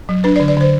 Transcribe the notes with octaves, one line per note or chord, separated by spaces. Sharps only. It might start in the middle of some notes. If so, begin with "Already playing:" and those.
F#3
D4 B4
D5
D3
D5
D3 C5